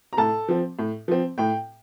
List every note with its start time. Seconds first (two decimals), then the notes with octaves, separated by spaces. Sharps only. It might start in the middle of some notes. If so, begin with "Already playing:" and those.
0.13 A#5
0.17 A2 A4 A5
0.48 F3 C4
0.79 A2
1.08 F3 C4
1.38 A2 G5